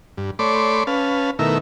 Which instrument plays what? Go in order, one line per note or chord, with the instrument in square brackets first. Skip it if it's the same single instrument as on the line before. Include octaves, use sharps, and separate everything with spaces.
[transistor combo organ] G2
A3 C#5 D5 B5 C6 D6
C#4 B4 F5 A5
B2 D#3 A3 E4 A#4 E5